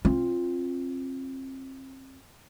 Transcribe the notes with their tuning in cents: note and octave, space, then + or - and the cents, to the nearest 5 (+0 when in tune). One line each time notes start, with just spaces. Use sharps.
C4 +30 F4 +0